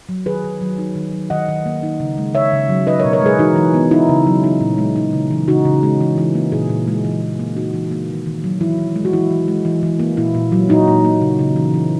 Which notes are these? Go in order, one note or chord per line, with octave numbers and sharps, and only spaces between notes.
F#3
D#3 G#4 B4
D#3
F#3
D#4
D#3
F#3
D#3 D#5 F#5
D#3
A#3
D#4
C#3
G#3
C#3 C#5 E5
C#3
F#3
D#4 B4 D#5
A#4 C#5
B2
A#4 C#5
G#3 G#4 B4
E3 D#4 F#4
E3
B3
D#4 E4
C#3
F#3
D#4
A#2
G#3
D#4
C#3
E3
C#3 D#4 F#4
C#3
G#3
E3
E3
A#3
A#2 E4 G#4
A#2
G#3
E3
E3
A#3
E3 D#4 F#4
E3
A#3
D#3
D#3
F#3
E3 E4
E3
G#3
F#4
E3 E4
E3
G#3
E3
E3
A#3
A#2 E4
A#2
F#3
A#2 D#4 F#4
A#2
A#3
C#3
C#3
E3
E3